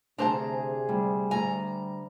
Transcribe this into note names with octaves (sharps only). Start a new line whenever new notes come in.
D2 C3 D4 G#4 C5 A5 A#5
D2 G3
D2 G#5 A#5